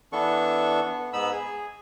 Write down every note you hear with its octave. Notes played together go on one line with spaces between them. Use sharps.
E3 B3 D4 A4 C#6
B3
G#2 B3 D#4 B5 E6
G#4